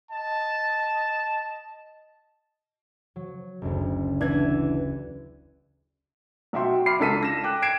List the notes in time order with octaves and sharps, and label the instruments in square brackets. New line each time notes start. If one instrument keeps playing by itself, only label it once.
[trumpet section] D#5 A5
[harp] F#3
F#1 D2
[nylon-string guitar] D3 E3 [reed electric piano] D4 G#6
[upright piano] B1 F#4 E5 G5 C6
B5 C6 D6 F6 C7
C#2 D4 A4 B6 D#7
A#6 E7
G5 D6 F#6
G#6 C7 D7 E7